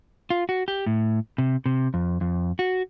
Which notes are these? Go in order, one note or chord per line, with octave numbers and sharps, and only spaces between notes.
F4
F#4
G4
A2
C3
C3
F2
F2
F#4